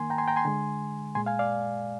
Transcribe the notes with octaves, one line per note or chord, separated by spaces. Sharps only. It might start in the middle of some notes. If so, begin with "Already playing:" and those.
Already playing: D#3 A#3 G#5 C6
G5 A#5
G#5 C6
G5 A#5
G#5 C6
D3 G#3
A#2 G#3 G#5 C6
F5 G#5
D5 F5